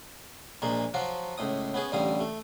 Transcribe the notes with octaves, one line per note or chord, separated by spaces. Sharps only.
A#1 A#2 G#3 A#3
F3 F#3 F4 F#4
C#2 A2 D#6
B3 C#4 G#4
A1 D3 G3 F5 D#6
A3